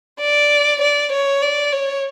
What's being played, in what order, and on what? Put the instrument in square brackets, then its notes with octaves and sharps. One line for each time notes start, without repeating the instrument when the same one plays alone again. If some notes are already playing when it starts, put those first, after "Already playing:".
[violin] D5
D5
C#5
D5
C#5